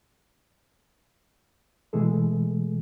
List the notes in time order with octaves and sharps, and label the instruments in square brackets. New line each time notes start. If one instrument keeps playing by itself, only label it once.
[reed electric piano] B2 E3 G#3 A3 G#4 A4